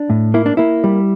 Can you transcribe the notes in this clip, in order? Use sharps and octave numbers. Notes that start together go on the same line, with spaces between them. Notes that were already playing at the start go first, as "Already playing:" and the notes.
Already playing: D4
A2
A#3 E4
D4
A#3 E4
G3